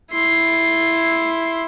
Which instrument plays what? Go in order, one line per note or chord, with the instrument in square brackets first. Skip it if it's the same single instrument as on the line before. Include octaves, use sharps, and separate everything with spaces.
[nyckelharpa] E4 C6